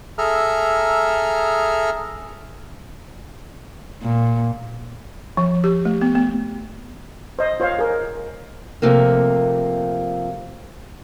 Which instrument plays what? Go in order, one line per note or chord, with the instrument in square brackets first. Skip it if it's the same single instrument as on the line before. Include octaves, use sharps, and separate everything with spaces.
[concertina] G#4 A4 E5 A#5 F6
[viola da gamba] A#2
[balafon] F3
G4
A3
B3
B3
[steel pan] C5 D#5
F4 C5 C#5 F5
G#4 A#4
[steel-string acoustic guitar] C3 F3 A3 A#3